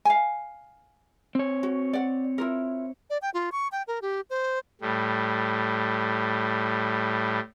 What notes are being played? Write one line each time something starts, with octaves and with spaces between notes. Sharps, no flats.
F5 G#5
C4 C#5
F#4
D5 F#5
E4 F4 A#4
D5
G5
F4
C#6
G5
A#4
G4
C5
A2 G3